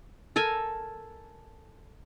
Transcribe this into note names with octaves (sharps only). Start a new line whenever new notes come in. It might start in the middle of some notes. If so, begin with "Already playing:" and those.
A4 A#4 G#5